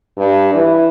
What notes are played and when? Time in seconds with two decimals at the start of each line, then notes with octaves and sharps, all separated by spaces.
0.18 G2
0.54 E3